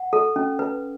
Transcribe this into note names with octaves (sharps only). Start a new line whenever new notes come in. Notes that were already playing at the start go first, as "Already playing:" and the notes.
Already playing: F#5
A4
C#4
B4